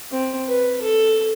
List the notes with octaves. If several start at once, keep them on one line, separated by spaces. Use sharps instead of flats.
C4
B4
A4